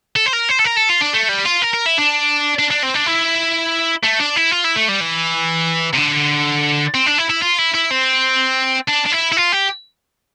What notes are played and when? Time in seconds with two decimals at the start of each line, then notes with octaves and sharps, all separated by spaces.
0.16 A4
0.26 C5
0.33 A#4
0.49 C5
0.59 A4
0.64 A#4
0.76 A4
0.89 F4
1.01 D4
1.13 A3
1.29 G3
1.45 F4
1.62 A#4
1.73 A#4
1.86 E4
1.98 D4
2.59 D4
2.71 D4
2.83 C4
2.94 D4
3.06 E4
4.04 A3
4.20 D4
4.36 E4
4.52 F4
4.65 E4
4.76 A3
4.89 G3
5.01 E3
5.93 C3
5.97 D3
6.94 C4
7.06 D4
7.18 E4
7.30 E4
7.42 F4
7.59 E4
7.74 E4
7.91 C4
8.88 D4
9.06 D4
9.12 E4
9.32 E4
9.37 F4
9.52 G4